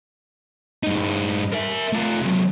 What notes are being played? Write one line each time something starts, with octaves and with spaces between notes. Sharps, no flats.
G2 D#4
A#4 E5
A3 F4
C3 F#3